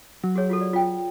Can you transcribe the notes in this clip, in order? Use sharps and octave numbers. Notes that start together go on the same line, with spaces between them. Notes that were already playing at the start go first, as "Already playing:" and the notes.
F#3
F#4 G#4 C#5
F4 F#4 A4
D5
F4 G5